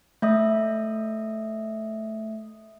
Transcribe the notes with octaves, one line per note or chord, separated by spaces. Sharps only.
A3 E5 D#6